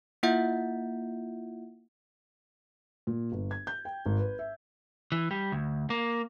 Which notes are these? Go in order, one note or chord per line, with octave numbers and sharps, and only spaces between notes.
A#3 E4 F4 E5 F#5 G6
A#2
G1
G#6
G6
G5
G#1
B4
E5
E3
G3
D2
A#3